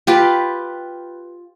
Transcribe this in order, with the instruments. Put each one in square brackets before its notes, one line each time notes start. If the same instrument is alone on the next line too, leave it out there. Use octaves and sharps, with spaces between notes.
[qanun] F4 G4 B4